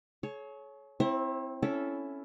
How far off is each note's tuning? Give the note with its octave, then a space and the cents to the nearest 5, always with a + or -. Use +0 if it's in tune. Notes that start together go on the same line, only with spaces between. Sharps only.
G#4 +45 C#5 +0
C4 +0 E4 -5 C5 +45
C#4 +10 E4 +5 A4 -10